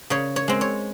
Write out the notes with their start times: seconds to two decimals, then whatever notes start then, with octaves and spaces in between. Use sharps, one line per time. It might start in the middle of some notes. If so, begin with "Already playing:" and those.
0.10 C#3 C#5
0.36 C#5
0.48 G#3 C4
0.61 C#5